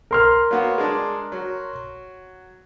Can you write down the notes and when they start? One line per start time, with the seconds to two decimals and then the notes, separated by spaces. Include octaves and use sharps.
0.11 A#4 C6 F6
0.51 F#3 A#3 B3
0.78 G#3 D4
1.32 F#3